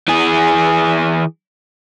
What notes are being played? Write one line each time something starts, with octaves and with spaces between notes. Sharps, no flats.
E3 G#4